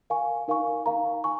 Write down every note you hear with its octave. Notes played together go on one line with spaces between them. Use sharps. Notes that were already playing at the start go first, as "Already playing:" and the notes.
A#4 F5 G#5 C#6
D#4 A#4 F5 G#5 C#6
D#4 A#4 F5 A#5
G#5 C#6